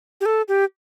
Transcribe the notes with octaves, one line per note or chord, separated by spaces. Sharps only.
G4
A4
G4